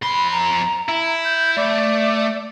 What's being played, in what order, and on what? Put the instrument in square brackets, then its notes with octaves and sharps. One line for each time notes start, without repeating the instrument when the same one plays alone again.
[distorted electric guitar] F2 C6 [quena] B5
[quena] A#5
[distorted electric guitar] E4
[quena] G6
[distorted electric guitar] A3 [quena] D5